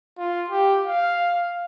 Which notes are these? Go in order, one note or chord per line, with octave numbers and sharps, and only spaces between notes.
F4
G4
F5